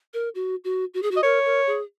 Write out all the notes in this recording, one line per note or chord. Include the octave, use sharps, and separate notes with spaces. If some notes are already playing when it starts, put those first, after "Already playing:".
A#4
F#4
F#4
F#4
G#4
F#4
D#5
A#4 C#5
A#4
G#4